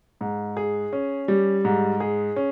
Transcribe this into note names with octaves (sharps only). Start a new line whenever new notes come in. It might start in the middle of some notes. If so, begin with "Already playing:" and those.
G#2
G#4
C#4
G3
G#2
G#4
C#4